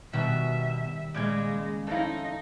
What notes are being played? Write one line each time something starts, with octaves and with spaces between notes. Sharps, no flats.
B2 D#3 G3 E5
A#2 C#3 G#3 D6 G#6 D7
F2 C#4 D#4 E4 A4 F5